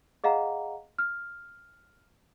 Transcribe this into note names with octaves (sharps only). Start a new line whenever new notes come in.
G#4 D#5 F5 F#5 A#5
F6